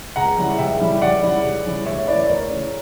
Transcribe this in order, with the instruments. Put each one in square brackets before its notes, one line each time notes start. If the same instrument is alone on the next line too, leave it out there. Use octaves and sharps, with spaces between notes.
[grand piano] C#2 F#5 A#5
C#3 G3 C#4 E4
C#2 E5 G5
C#3 G3 C#4 E4
C#2 D5 F#5
C#3 G3 C#4 E4
C#2
C#3 G3 C#4 E4
D2 C#5 E5
C#3 E3 B4 D5
D5
D2 A#4 C#5
C#3 E3